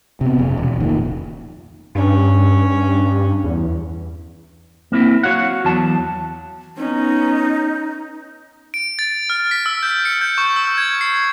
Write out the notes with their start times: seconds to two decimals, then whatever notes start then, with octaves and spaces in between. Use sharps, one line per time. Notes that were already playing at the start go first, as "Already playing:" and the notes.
0.21 C3 B3
0.39 F1 C#3
0.57 E1
0.80 F1 A#2 D#3
1.95 G2 C#4
3.44 E2
4.92 A#3 C4 E4
5.23 F#4 C#5 F5 F#5
5.65 E2 F#3 A5
6.77 B3 C#4 D#4
8.74 D7
8.99 A6
9.30 F6
9.51 B6
9.66 E6
9.83 G6
10.05 C#7
10.21 G6
10.38 C#6
10.56 E6
10.78 G#6
11.01 C7